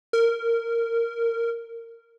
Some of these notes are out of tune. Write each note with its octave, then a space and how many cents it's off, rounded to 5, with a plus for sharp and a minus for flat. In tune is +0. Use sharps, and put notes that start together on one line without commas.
A#4 -15